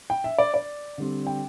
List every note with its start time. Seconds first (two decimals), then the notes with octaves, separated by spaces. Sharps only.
0.10 G5
0.24 E5
0.38 D5
0.54 D5
0.98 D3 G3 C4
1.27 G5